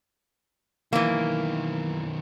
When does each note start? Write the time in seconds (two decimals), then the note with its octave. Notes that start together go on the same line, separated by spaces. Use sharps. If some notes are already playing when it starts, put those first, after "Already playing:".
0.93 B1 D#3 E3 A#3